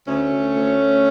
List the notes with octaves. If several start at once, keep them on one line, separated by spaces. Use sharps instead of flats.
D2 A3 C#4
D2
D2
D2